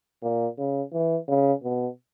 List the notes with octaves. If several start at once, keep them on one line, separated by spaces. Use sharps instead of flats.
A#2
C#3
E3
C#3
B2